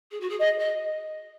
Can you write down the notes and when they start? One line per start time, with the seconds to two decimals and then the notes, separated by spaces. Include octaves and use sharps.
0.11 G#4
0.20 F#4
0.29 G#4
0.40 G#4 D#5
0.59 D#5